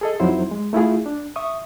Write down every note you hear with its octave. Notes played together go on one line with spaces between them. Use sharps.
G#4 A4 D#5
F2 F#3 D#4 E4 C5 C6
G#3
A3 E4 F4 G#4
D4
E5 C#6 D#6